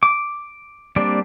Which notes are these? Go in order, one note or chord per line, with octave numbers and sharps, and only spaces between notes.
D6
G3 A#3 C4 D4 D5